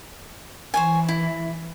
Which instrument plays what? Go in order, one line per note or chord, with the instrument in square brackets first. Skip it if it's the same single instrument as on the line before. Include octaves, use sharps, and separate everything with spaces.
[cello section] E3 [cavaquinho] C5 C#5 G#5
[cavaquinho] E4